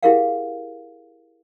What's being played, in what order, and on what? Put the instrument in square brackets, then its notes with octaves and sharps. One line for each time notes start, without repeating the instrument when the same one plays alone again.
[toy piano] E4 G4 G#4 A#4 F5 F#5